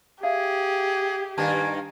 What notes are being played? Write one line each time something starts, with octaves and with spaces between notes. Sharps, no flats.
G4 G#4 E5 F5 G#6
G2 D#3 A#3 G#5 A5